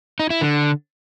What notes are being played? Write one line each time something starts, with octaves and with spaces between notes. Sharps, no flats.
D#4
E4
D3